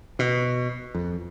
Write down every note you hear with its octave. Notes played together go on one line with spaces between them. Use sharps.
B2
F2